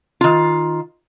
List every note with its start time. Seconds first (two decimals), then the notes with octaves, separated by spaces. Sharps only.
0.21 D#3 F4